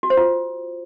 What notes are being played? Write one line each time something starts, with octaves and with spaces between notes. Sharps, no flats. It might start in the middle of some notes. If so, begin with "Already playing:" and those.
F#4
C5
F4